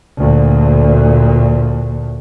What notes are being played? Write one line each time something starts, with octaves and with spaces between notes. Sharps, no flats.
D2 A#2